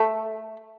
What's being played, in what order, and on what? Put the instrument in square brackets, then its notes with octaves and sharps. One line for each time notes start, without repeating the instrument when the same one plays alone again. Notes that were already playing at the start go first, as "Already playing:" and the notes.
Already playing: [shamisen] A3